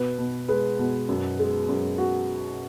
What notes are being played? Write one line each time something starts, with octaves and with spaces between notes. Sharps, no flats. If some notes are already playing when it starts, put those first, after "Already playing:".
Already playing: B2 B4
B2
G#3 B4
B2
F#2
G#3
F#2
F#4